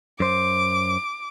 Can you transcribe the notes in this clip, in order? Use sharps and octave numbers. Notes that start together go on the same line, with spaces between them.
F#2 C5 D6